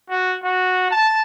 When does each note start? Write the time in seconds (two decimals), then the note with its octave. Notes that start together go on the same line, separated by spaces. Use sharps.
0.10 F#4
0.44 F#4
0.91 A5